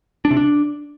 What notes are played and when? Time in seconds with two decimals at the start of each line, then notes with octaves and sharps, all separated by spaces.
0.25 D4
0.31 C3
0.37 D4